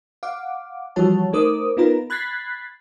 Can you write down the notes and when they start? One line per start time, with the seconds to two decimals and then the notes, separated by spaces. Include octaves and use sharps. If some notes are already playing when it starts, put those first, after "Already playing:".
0.23 F5 F#5 D6
0.96 E3 F3 G3 F#4 C#5 A5
1.33 A3 D#4 A#4 C5 D6 D#6
1.77 B3 D#4 F4 A#4 B4 A#5
2.10 B5 F#6 G#6 A6 B6 C7